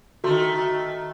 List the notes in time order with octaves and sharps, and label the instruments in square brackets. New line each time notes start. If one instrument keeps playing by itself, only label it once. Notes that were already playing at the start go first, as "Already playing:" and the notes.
[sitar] D#3 A3 [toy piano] F#4 C6